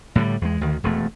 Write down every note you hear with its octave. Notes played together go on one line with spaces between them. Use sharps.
A2 D3 E3 G3
E2 G#3
D2 D#3
E1 F2 A3